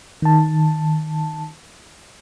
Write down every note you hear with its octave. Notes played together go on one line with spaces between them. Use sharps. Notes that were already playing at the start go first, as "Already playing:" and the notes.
D#3 A5